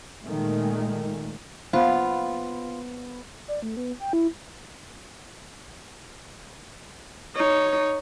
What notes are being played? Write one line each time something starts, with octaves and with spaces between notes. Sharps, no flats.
A#2 D#3 G#3 A3
B3 F4 C5 F5 F#5
D5
A3
B3
G5
E4
D#4 C#5